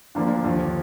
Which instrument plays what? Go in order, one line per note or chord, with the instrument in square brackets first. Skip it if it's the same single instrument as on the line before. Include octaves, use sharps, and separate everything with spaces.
[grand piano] D2 D3 F3 A#3 D4
D#2 D3 F3